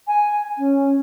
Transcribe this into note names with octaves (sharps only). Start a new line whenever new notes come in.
G#5
C#4